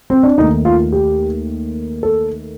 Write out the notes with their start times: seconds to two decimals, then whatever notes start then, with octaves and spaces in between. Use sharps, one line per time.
0.10 C4
0.23 D4
0.38 D#2 D#3 A3 D#4
0.65 F4
0.92 G4
2.03 A4